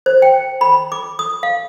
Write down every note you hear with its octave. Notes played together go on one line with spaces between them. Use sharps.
C5
G5
B5
D6
D#6
F5